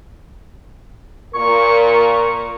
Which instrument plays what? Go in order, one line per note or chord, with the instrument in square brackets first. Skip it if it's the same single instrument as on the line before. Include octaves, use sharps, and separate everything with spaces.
[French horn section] A#2 A#4 [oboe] C#6